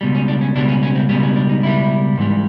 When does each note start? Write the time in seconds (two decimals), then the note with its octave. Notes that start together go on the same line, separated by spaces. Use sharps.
0.01 C#2 B2 G3
0.15 C#4
0.28 D4
0.41 C#4
0.55 C#2 B2 G3 D4
0.69 C#4
0.83 C#4
0.95 C4
1.09 C#2 B2 G3 C#4
1.23 C#4
1.36 D4
1.50 D#4
1.62 C#2 B2 G3 E4
2.17 G#2 E3 G3